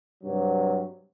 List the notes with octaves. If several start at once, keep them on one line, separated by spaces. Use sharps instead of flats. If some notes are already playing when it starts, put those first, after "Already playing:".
G2 C3 F#3